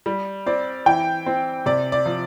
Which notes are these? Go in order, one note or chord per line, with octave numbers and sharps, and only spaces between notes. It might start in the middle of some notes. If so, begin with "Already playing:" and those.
G3
C4 D5
E3 G5
C4
C3 D5
D5
F3